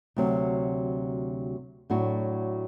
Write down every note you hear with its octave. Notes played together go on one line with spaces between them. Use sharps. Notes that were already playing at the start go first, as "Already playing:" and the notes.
D2 C3 F#3
A2 F#3 A3 D4 F#4